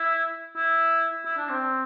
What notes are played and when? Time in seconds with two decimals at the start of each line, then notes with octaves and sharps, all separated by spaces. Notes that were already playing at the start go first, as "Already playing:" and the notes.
Already playing: E4
0.56 E4
1.25 E4
1.37 D4
1.49 C4